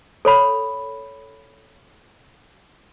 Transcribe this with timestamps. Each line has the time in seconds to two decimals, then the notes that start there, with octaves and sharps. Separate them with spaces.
0.25 A4 C#5 B5